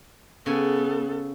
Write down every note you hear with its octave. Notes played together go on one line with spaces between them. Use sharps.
C#3 B3 A4 G#5